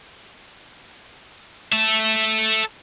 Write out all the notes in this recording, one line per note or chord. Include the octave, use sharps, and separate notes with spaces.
A4 E5